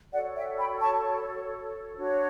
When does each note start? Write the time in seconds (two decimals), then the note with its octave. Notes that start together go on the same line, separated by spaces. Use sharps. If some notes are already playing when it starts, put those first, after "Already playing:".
0.12 F#4 A4 C#5 D5 F#5
0.35 E5 G5
0.58 G5 B5
0.81 A5 C#6
1.95 D4 F#4 C#5